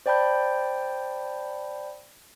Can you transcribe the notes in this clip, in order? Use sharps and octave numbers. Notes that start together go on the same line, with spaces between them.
C5 D5 G5 A5 B5 G6